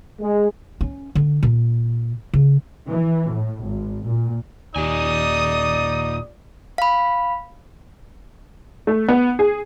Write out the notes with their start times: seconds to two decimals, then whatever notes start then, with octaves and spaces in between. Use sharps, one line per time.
0.20 G#3
0.81 C#4
1.15 D3
1.43 A#2
2.34 C#3
2.88 E3
3.31 A2
3.64 G#1
4.06 A#2
4.76 D#2 A#2 D#4 G4 D5 G#5 D#6
6.78 F5 B5
8.87 A3
9.08 B3
9.39 G#4